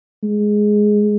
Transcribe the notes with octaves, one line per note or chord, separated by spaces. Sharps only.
G#3